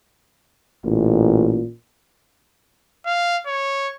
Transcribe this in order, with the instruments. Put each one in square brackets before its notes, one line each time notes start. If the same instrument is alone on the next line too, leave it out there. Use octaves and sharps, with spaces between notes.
[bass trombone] A1 [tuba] A#2
[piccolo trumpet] F5
C#5